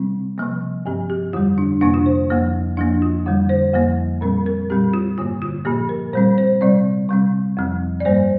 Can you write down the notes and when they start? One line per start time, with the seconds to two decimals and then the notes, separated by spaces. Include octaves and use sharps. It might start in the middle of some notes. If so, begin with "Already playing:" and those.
Already playing: C3 G3 C4
0.38 C3 F3 A#3
0.86 G2 F3 C4 G4
1.10 G4
1.33 F2 D3 G3 F4
1.58 D4
1.81 F2 C3 A#3 D4
1.94 F4
2.06 C5
2.30 F2 F3 A#3
2.77 F2 F3 A#3 D4
3.02 F4
3.26 F2 D3 G3
3.49 C5
3.74 F2 F3 A#3
4.21 A#2 G3 C4 A#4
4.46 A#4
4.70 A#2 G3 C4 G4
4.93 F4
5.18 G2 D3 A#3 F4
5.42 F4
5.65 A#2 F3 A#3 G4
5.89 A#4
6.13 A#2 G3 C4 C5
6.38 C5
6.61 C3 G3 C4 D5
7.09 C3 G3 C4
7.57 F2 F3 C4
8.00 D5
8.05 G2 G3 A#3 C5